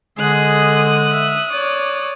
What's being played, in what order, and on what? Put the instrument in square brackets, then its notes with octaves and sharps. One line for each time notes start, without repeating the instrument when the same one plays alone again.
[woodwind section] D3 G#3 [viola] G#4 [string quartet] D#6 F#6
[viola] E5
C#5 D5